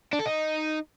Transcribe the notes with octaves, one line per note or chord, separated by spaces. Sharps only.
D4
A4
D#4